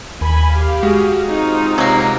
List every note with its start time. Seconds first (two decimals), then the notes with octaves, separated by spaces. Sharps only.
0.21 D#2 G#5 B5
0.51 G4 F5
0.83 G#3 F#4 G#4
1.28 C4 D#4 F4
1.78 C3 F#3 A#3